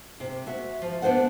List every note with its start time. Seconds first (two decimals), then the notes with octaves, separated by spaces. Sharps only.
0.20 C3
0.47 F#4 E5
0.82 F3
1.02 B3 D4 B4 C5 F#5